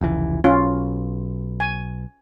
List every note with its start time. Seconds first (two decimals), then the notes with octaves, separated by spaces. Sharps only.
0.01 F1 C#2 E3
0.44 B1 C#4 F4
1.60 G#5